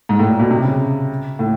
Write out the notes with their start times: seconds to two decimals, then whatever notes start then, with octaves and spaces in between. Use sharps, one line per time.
0.09 G#2
0.19 A2
0.30 A#2
0.39 B2
0.51 C3
0.64 C#3
1.39 A2